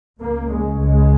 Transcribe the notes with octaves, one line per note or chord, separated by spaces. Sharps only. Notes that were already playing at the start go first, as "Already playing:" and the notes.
C#2 C#3 A#3
G#3
G#3